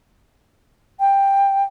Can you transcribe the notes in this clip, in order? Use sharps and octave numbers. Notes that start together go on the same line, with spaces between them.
G5